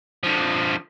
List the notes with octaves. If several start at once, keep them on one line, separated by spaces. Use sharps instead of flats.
D3 F3